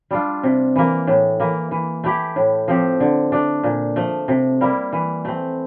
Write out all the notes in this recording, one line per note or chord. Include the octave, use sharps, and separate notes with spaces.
G3 D4 F4
C3
E3 A#3
A2
E3 A#3
E3
A3 E4 G4
A2
F3 C4 G4
D3
A3 D4
A#2
F3 A3
C3
G3 A#3 E4
E3
A3 C4